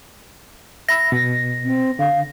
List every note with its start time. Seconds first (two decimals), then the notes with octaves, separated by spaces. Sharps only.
0.89 E5 B5 E6 A#6
1.12 B2
1.65 C4
1.99 D3 F5